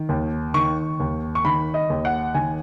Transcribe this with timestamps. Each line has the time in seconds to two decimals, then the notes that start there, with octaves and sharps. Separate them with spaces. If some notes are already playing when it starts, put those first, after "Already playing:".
Already playing: D#3
0.09 D#2
0.54 D#3 C#6
1.00 D#2
1.35 C#6
1.45 D#3 B5
1.74 D#5
1.90 D#2
2.05 F#5
2.35 D#3 G#5